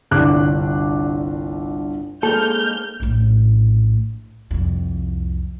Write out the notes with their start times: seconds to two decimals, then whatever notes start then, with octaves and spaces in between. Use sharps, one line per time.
0.11 G1 C2 D4 D6 F#6
2.23 G#3 A#3 A4 F6 G6
3.00 A#1 A2
4.51 C2 F2